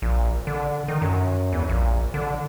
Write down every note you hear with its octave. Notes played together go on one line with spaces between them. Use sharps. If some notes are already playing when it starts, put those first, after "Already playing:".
A#1
D3
D#3
F#2
E2
A#1
D3